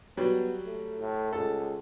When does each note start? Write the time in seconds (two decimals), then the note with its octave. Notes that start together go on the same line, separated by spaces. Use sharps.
0.17 F#3 G3 B3
0.65 A3
0.99 A2
1.33 C#2 A4